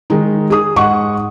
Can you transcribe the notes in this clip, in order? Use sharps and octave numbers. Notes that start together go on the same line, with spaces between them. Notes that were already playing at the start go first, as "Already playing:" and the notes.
D#3 G#3 D#4
G#4 D#6
G#2 F#5 C#6